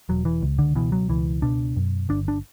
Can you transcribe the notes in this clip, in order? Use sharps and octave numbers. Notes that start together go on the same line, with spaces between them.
E1 F#3
E3
C#2
D3
B2 E3
F#3
C#2 E3
B2 D4
F#2
G1 D4
D4